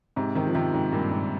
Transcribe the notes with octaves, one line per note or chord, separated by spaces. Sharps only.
G#2 C3
C3 D#3
F3
C3 D#3
G#2
G2 A#2
G#2